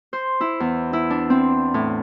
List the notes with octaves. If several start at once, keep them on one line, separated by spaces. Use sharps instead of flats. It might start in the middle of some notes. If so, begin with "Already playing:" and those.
C5
E4
E2
E4
D4
C4
A2